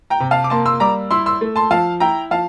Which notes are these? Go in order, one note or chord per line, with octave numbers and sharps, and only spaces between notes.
G5 A#5
C3
F5 A5
D6
A#3 A5 C6
C6 E6
G3 A#5 D6
E4 C6 E6
C6 E6
A3
A5 C6
F3 F5 A5
E4 G5 A#5
F3 F5 A5